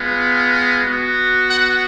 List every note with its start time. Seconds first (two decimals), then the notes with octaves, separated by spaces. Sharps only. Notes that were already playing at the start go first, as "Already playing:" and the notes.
Already playing: G#3 B3 F4
0.83 B3 F#4
1.48 F#5